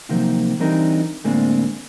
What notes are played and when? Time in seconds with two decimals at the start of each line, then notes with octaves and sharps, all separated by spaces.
0.09 C3 D#3 F3 F#3 A#3 C4
0.60 E3 G3 C4 D4 D#4 A#4
1.24 D2 A2 G#3 A#3 C4 D4